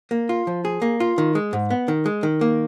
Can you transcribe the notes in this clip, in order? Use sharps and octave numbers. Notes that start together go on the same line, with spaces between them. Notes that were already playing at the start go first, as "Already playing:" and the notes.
A#3
F4
F3
G#4
A#3
F4
D#3
G#3
G#2
B3
D#3
G#3
D#3
A#3